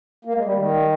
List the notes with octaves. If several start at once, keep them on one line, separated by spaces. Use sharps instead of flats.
A#3
G#3
G3
D#3